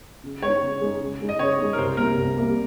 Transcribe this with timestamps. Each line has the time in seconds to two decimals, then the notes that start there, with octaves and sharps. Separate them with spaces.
0.24 C#3
0.42 G#3 C#5
0.47 D#4
0.62 C#3
0.81 G#3 D#4
1.01 C#3
1.21 G#3 D#4
1.29 D#5
1.39 C#3 C#5
1.59 G#3 D#4
1.73 A#4
1.78 C2 C5
1.97 C3 G3 A#3 A#4
2.17 C2
2.37 C3 G3 A#3